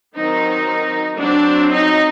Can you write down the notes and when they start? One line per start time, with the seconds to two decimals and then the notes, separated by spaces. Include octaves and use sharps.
0.15 D#3 F#3 C4 D#4
1.18 F#3 C4 D4
1.70 D#4